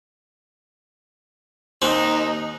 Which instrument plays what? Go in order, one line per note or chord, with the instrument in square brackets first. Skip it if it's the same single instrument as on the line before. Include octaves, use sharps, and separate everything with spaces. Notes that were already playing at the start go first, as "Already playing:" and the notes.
[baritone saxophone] D#2 [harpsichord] C4 [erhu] D#4